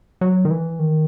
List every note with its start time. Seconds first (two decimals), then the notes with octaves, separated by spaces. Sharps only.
0.21 F#3
0.45 D#3
0.51 E3
0.79 D#3